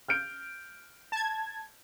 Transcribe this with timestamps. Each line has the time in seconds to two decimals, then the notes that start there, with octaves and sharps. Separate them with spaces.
0.08 F6 G6 D7
1.12 A5 G#6